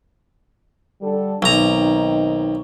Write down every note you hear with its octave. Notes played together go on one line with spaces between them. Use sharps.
D3 G3 A4
B1 D#3 C4 D#4 A#5